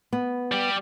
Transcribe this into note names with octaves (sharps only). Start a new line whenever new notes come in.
B3
G3 G4